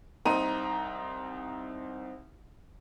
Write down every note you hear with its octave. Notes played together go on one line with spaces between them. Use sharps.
C2 C4 D#4 A#5 C6 D#7